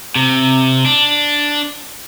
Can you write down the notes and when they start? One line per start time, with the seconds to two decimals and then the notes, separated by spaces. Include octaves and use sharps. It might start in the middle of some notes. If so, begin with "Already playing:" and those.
0.16 C3
0.86 D4